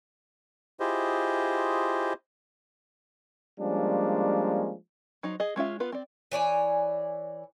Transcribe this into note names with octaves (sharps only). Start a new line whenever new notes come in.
E4 F4 G4 G#4 C5 D#5
F3 G3 G#3 A#3 C#4 D4
F#3 D#4 C5
G#4 D#5
G#3 C#4 F4 E5
B3 F4 B4
C4 D5
E3 C#5 D5 G#5